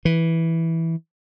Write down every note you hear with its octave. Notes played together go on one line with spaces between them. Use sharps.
E3